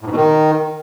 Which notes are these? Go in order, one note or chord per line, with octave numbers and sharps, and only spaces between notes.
A2
G#2
B2
D#3